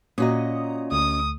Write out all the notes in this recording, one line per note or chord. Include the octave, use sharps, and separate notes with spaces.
A#2 C#4 F#4 D#5 A#5 D#6
D2 A3 D#6